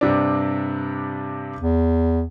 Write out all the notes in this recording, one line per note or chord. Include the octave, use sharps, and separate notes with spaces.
G2 C3 D4
E2